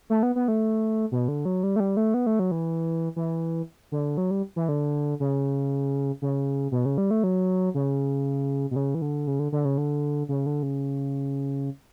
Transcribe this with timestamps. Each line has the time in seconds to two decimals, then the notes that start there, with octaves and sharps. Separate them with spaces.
0.10 A3
0.23 B3
0.35 B3
0.48 A3
1.12 B2
1.28 D3
1.45 F#3
1.63 G3
1.76 A3
1.80 G3
1.97 A3
2.14 B3
2.26 A3
2.39 F#3
2.51 E3
3.16 E3
3.92 D3
4.17 F#3
4.31 G3
4.56 E3
4.69 D3
5.20 C#3
6.22 C#3
6.72 B2
6.85 C#3
6.98 G3
7.11 A3
7.24 F#3
7.75 C#3
8.71 B2
8.76 C#3
8.95 E3
9.02 D3
9.27 C#3
9.39 D3
9.52 D3
9.65 C#3
9.77 D3
10.29 C#3
10.46 D3
10.63 C#3